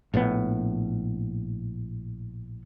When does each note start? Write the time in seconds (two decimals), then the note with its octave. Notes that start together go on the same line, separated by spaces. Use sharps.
0.14 A#1 A2 D#3 B3